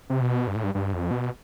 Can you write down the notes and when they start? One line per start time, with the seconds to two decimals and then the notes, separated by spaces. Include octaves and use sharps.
0.10 C3
0.21 B2
0.47 G2
0.55 A2
0.64 G2
0.75 G2
0.93 F2
1.11 B2